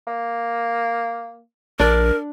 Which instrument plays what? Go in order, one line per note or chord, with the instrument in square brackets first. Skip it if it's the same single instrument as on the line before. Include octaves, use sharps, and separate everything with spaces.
[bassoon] A#3
[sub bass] A#1 [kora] D4 D5 [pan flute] A#4